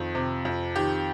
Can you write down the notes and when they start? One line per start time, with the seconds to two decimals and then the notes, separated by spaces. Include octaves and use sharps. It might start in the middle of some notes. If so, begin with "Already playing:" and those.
Already playing: F2 D#3
0.15 C3
0.45 F2
0.76 D#3 G4